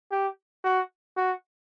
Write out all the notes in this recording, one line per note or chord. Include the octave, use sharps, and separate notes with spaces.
G4
F#4
F#4